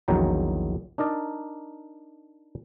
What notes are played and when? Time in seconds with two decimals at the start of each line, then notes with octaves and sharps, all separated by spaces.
0.08 A#1 E2 D#3 F#3 G5 A#5
0.98 D4 D#4 A#4 D5